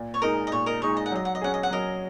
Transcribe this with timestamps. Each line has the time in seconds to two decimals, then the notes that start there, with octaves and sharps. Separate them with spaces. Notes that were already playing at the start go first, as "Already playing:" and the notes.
Already playing: A#2
0.14 C#5
0.22 G#3 D#4 A#4 D#5
0.47 D#5
0.52 A#2 C#5
0.66 A#4 D#5
0.82 G#3 D#4 C#5
0.97 D#5
1.06 F#5
1.12 F#3 D#5
1.25 F#5
1.35 D#5
1.41 C#4 G#4 F#5
1.54 D#5
1.63 F#5
1.70 F#3 A#4 D#5